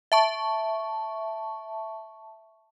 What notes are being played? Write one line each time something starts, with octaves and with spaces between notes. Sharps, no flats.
E5 A5 C#6